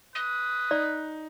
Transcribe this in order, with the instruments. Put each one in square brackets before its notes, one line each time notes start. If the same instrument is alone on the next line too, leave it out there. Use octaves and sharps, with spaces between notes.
[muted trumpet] B4 [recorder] D#6
[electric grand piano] D#4 [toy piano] D5